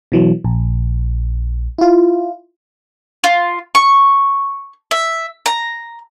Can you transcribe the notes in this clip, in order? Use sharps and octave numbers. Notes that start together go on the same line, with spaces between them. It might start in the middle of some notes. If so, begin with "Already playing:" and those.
B2 E3 F#3
A#1
E4 F4
F4
C#6
E5
A#5